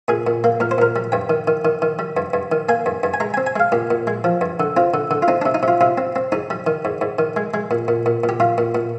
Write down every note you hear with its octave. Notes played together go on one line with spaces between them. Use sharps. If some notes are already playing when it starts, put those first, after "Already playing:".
A#2 G#4
A#2
A#3
A#2 A#4
C5
A#2 A#4
G3
G2 G5
D#3
D#3
D#3
D#3
G3
G2
G2
D#3
A#3 G#5
G2
G2
G#5
G#3 A#5
C4 G#5
G#5
G#3 F5
A#2 G4
A#2
G#3
F3
G2
D3
C4 F4
D3
D3
F4
C4 D#4
C3 D4
D#4
C3
F4
C3 F4
C4
C4
G#2 D#4
G3
D#3
G#2
G#2
D#3
G#3
G#3
A#2
A#2
A#2
A#2
G4
G3 F4
A#2
A#2